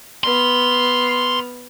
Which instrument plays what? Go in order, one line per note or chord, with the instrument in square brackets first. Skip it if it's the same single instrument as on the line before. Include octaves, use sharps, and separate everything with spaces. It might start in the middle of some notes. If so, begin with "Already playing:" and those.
[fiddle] B3 F6 [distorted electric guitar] C6